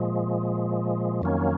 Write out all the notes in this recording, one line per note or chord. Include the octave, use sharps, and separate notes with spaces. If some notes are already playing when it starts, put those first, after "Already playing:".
Already playing: A#2 F3 G#3
F2 D#3 F#3 A#3 C#4